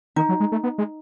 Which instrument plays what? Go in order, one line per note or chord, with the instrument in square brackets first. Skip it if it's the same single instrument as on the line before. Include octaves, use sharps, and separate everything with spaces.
[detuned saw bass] D#3 [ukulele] D#4
[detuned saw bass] F#3
G#3
A3
B3
G#3